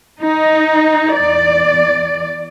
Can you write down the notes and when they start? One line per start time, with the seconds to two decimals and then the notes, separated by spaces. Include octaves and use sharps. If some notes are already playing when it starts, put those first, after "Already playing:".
0.19 D#4
1.14 E2 D5